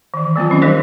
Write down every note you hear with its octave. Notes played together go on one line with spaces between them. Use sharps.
D#3 E3
F#3 A#3 C4 F4
D#3 C#4 D#5
G3 D#4 G4 A#4 C5